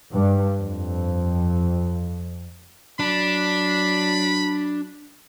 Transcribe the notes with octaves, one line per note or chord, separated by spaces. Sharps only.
G2
F2
F#3 D4 B5